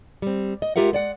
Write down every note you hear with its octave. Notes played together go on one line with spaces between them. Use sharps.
G3 C4
D#5
G#3 F4 G4 A#4 E5 F#5
G#3 D5 F#5